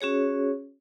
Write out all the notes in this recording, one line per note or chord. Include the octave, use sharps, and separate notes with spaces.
C#4 F#4 G#4 C#5